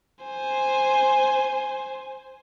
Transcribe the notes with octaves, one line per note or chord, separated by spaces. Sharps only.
C5 G#5